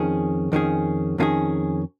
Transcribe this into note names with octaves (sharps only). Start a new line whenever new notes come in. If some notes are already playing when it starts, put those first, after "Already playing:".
Already playing: F2 D#3 C#4 G#4
F2 D#3 C#4 G#4
F2 D#3 C#4 F4 G#4